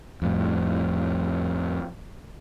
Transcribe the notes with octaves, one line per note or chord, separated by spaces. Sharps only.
F2 A2